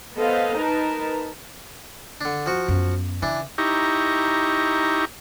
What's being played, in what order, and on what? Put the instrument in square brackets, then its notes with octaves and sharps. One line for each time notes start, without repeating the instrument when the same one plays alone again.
[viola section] B3 A4 C5 D#5 F5
D#4 A#4 B4 A5
[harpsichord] D3 D4
F3 F#4
[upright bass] F#2 B3
[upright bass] C#3 [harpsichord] E3 D4
[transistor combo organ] D#4 E4 G4 A#5 C#6